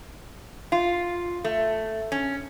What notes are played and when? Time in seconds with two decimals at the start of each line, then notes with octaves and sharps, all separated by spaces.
0.72 F4
1.44 A3
2.12 C#4